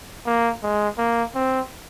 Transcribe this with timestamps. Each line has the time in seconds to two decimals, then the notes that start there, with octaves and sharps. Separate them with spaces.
0.26 A#3
0.63 G#3
0.98 A#3
1.35 C4